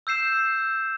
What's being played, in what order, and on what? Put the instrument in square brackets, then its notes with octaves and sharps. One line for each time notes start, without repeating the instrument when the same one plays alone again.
[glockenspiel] E6 G6 C7 E7